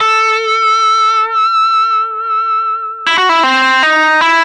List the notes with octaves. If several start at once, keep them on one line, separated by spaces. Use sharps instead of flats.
A4
E4
F#4
E4
C4
D#4
E4